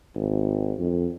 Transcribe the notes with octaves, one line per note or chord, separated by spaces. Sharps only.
G#1
F2